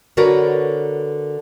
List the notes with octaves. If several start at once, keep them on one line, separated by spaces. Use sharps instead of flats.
D3 F#4 A#4 B4 C#5 D5